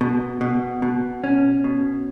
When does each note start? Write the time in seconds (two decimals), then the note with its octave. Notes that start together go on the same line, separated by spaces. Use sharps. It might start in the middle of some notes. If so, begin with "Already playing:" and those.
0.01 B2
0.41 B2
0.82 B2
1.24 C#4
1.64 B2